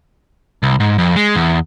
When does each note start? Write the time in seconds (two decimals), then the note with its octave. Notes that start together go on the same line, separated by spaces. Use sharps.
0.63 C2
0.80 G#2
0.98 F2
1.16 G#3
1.35 E2